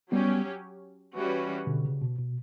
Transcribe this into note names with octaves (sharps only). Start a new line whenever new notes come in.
F#3 G3 B3 C#4 G4
E3 G3 C#4 F#4 B4
B2 D3
C#3
B2
B2